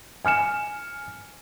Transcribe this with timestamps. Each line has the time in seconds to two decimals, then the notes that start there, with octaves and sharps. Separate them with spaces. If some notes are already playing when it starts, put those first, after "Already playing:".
0.25 G#5 F6 C#7 E7